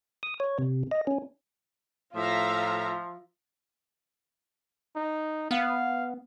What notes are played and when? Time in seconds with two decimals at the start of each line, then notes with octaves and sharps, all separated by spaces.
0.23 D#6
0.40 C#5
0.59 C3
0.91 D#5
1.07 C#4
2.16 A2 F3 F4 E5 F5 A#5
4.96 D#4
5.51 B3 F5